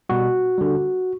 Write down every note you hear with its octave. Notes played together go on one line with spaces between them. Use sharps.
B2 G3 F#4
D3 G3